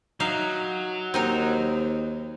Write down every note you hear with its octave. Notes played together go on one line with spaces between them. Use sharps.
F#3 D#4 E5 F5
D#2 C4 D#4 A#4